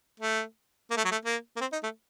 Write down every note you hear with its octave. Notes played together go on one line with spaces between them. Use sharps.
A3
A#3
A3
F#3
A3
A#3
A#3
C4
D#4
A3